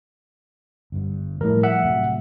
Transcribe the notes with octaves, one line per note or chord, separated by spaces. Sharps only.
G1 G2
A2 F3 G3 A3 A#4
E5 F#5
A2 C3 F#3